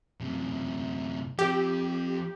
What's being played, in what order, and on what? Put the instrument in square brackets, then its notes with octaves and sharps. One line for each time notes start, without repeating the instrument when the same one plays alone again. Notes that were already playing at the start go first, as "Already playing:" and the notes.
[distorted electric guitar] F#2 C3
[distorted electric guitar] F3 C4 [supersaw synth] G4